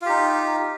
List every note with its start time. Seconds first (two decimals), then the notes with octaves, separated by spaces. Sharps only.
0.02 F4
0.06 G4
0.09 D#4